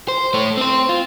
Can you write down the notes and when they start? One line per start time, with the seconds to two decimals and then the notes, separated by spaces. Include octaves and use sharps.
0.08 C5
0.34 A3 C#5
0.57 C4 C5
0.89 F4